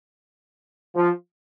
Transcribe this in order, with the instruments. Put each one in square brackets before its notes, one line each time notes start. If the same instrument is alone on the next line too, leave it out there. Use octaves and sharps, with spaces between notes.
[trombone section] F3